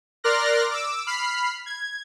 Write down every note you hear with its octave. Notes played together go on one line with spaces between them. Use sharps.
A#4 D5 C6 F6 F#6 A#6
D6 E6
B5 F6 C7
G#6